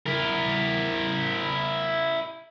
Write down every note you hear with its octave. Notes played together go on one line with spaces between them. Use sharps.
E4 A#4